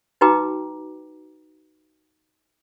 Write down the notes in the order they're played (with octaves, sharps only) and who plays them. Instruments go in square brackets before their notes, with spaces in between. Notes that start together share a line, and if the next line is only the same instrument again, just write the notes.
[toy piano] D#4 F#4 B4 G5 A#5 D6